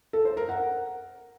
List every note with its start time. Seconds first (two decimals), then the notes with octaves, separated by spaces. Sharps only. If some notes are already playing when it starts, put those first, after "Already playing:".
0.13 A4
0.25 C5
0.37 A#4
0.49 F#5